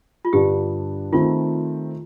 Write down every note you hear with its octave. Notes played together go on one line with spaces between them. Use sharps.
F4
G2 D3 G3 D4 G4
D#3 A3 C4 F4